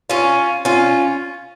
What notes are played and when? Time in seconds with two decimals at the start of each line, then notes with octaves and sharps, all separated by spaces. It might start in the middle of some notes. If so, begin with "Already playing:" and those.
0.10 C#4 F4
0.65 C#4 F4